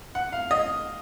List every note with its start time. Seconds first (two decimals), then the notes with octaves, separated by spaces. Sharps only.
0.15 F#5
0.32 F5
0.51 D#5